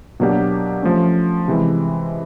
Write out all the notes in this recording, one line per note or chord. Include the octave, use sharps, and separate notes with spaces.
B2 F#3 A#3 D4 G4
F3 A3 C#4
C3 E3 G#3